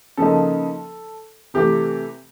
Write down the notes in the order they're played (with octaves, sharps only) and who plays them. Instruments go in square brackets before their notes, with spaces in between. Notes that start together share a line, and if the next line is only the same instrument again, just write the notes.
[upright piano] C#3 F3 A#3 D#4 A4
C3 E3 A3 G4